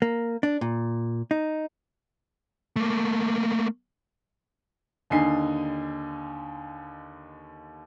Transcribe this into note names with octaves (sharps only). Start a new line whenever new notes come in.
A#3
D4
A#2
D#4
A3 A#3
D#2 D3 D#4 G#5 C7